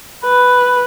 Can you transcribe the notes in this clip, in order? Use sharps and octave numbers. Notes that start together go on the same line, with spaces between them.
B4